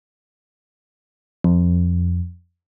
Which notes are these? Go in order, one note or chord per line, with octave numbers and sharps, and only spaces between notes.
F2